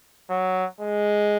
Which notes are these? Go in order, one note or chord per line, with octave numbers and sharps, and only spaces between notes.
F#3
G#3